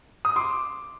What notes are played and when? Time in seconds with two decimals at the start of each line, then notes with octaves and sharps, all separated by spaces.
0.25 D#6
0.36 C6 D6